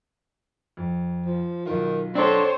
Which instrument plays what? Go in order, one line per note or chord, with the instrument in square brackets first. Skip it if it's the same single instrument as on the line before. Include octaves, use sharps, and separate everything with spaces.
[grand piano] F2
[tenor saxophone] F3
[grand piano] B1 F4 [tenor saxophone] D#3
[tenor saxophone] C4 [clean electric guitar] D4 A4 [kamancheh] C5 C#5